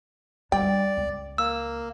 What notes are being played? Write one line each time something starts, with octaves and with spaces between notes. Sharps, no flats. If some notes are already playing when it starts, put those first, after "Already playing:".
G3 D4 D5 G5
C#2
A#3 E6